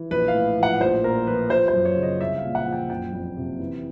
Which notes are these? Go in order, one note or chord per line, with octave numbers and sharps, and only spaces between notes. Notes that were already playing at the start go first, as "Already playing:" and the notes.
Already playing: E3
A#1 B4
F5
A2
F3
F#5
A#1 C5
A#2 A#4
F3 B4
F3 C5
C5
F#2
C#5
C#3
D#5
C2 E5
F5
A#2
F#5
F3
G5
F#1 G5
F2
C3
E3